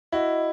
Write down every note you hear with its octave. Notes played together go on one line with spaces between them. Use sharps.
E4 F#4 D#5